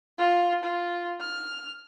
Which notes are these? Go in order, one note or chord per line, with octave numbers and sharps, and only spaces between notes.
F4
F4
F6